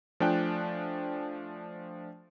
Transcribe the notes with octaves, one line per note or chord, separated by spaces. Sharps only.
F3 A3 D4 G5 G#5 F#6